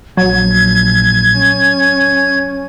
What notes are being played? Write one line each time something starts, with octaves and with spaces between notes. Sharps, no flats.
A#1 F#3 G#6
C#4